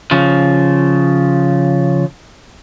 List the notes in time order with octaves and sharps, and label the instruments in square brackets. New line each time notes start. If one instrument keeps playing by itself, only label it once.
[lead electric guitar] C#3 F3